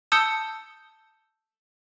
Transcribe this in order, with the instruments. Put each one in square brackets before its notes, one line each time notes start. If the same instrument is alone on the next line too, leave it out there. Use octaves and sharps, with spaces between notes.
[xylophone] A5 D#6 E6 G6 C#7 G7